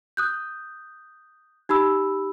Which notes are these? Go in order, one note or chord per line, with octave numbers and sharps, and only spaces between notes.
D#6 F#6 G6
D#4 G4 B5 E6